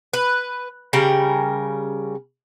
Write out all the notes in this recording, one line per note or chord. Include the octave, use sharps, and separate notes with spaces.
B4
C#3 G3 A#4 G5